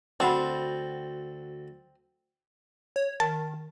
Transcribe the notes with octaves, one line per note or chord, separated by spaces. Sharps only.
D2 C4 F#4 E5 F#5 A5 B5
C#5
D#3 A5